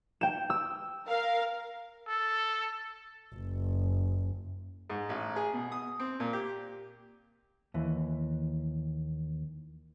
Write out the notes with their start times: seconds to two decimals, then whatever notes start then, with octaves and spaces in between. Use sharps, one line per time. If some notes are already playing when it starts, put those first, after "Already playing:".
0.21 G5 E7
0.50 E6
1.07 A#4 F5
2.08 A4
3.35 F#1
4.90 G#2
5.09 A1
5.36 G#4
5.53 B2
5.72 D#6
5.99 C4
6.20 A#2
6.33 G4
7.74 D#2 E3